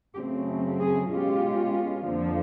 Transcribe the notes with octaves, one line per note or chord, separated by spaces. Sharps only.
F#2 C#3 F#3 A3 C4 G4
G#4
B2 G#3 C#4 F4 G4
F2 D3 F3 A#3